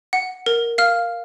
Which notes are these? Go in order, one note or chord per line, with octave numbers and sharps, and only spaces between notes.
F#5
A#4
F5 F6